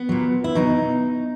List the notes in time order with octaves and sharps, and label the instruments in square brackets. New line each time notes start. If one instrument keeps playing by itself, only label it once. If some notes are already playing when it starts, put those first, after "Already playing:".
Already playing: [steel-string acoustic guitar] B3
A#2 F#3
E4
B2 F#3 D#4